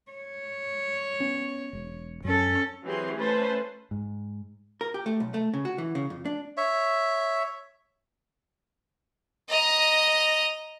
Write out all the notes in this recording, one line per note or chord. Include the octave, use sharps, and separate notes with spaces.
C#5
B3 C#4
E1
F#2 C#4 A4
E3 F#3 C4 G4 G#4 C6
A3 C#4 B4 C5 A5
G#2
A#4
G4
A3
B1
A3
C#3
F#4
E3
C#3
F2
D4
C#5 E5
D#5 A#5